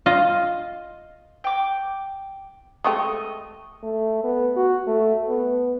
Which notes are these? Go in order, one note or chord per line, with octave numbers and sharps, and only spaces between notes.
F4 D#5
G5 D6
G#3 A3 G4 D#5 C#6
A3
B3
F#4
A3
B3